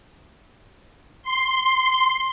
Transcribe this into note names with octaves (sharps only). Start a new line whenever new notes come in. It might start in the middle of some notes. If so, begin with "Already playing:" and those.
C6